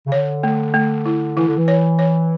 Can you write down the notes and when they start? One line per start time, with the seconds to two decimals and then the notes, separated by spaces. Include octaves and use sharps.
0.07 C#3
0.12 D3 C#5
0.43 A3
0.74 A3
1.06 E4
1.37 E3 E4
1.46 D3
1.58 E3
1.68 C#5
1.99 C#5